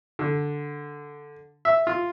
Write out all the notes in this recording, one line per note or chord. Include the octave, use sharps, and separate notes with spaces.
D3
E5
F4